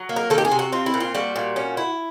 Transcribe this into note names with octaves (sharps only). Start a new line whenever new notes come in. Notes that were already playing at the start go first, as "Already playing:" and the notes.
Already playing: F#3
A#3
A#4
D#3 A4
G4
G#4
C3
F#4
C4 F4
E4
A#2
F4
G3 F#4
A#2
C#4
E4